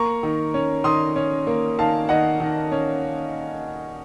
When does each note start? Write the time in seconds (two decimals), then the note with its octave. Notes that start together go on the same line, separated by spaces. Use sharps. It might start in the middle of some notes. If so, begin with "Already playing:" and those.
Already playing: A#3 A#5 C#6
0.23 D#3
0.54 C#4
0.84 D#3 C6 D#6
1.16 C#4
1.47 A#3
1.78 D#3 F5 A5
2.09 D#3 D#5 F#5
2.40 D#3
2.72 C#4